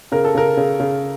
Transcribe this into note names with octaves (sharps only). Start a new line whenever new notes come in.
C#3 A#4
A4
C#3 A#4
C#3
C#3